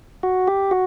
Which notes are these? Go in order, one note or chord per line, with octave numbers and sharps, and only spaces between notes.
F#4
G4
F#4